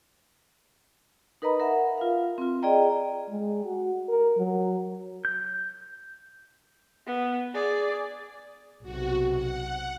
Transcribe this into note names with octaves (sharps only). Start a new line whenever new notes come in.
D#4 A#4 B4 D#5 A#5 B5
A#4 E5 F#5
F4 F5
C4 F4
G#4 D5 D#5 G5 A#5
G#3
F#4
A#4
F#3
G6
B3
G#4 D5
B1 C3 F#4
F#5